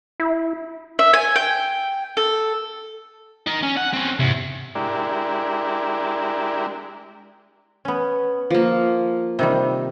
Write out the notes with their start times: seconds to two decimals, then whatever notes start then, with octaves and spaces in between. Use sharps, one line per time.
0.20 E4
0.99 E5
1.13 G#5
1.36 G5
2.17 A4
3.47 D#4 A#4
3.63 C#4
3.77 F#5
3.94 C4 C#4
4.19 E2 G#2 C3
4.75 G#3 D4 E4 G4 A#4
7.85 B3 C#4
8.50 F3 A#3
9.39 C3 D#3 G3